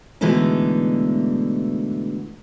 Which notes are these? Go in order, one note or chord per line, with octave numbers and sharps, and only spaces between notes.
B2 D3 E3 G#3 A3 D#4